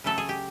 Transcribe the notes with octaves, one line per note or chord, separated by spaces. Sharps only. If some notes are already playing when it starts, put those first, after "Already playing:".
C#3 F#3 A3 A4
G#4
G4